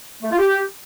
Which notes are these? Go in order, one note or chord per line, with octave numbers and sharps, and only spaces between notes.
A3
F4
G4